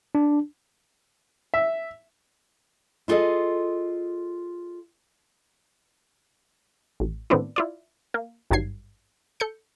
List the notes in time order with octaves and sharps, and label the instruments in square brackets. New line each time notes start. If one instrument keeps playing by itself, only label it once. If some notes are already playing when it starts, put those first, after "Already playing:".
[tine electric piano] D4
[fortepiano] E5
[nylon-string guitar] E4 F4 G#4 A4 D#5
[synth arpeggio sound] A1
A2 D#3 B3 C4 D4 E4
E4 F4 D5
A#3
G#1 G2 D#3 F#3 G#6 C7
A4 G6 C#7